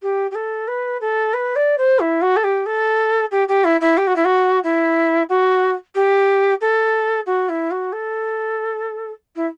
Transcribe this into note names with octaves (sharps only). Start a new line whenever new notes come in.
G4
G4
A4
B4
A4
B4
D5
C5
E4
F#4
A4
G4
A4
G4
G4
E4
E4
G4
F#4
E4
F#4
E4
F#4
G4
A4
F#4
E4
F#4
A4
E4